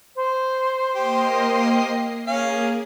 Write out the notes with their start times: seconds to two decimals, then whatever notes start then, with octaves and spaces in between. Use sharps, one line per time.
0.16 C5
0.96 A#3 G4 D#5 C7
2.27 A#3 C#4 G#4 F5 G#5